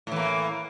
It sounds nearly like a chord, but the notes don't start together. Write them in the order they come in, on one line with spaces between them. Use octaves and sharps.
A2 E3 A#3